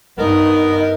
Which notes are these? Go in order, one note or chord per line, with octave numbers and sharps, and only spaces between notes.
G2 B3 D#4 A#4